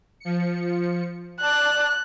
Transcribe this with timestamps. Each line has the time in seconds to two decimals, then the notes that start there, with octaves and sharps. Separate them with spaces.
0.20 F3 C#7
1.41 D5 A5 F#6